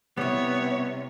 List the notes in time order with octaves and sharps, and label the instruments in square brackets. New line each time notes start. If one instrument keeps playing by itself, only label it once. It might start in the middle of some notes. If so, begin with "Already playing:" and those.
[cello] C3 [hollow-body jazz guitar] G3 E4 [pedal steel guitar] B3 [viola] C#5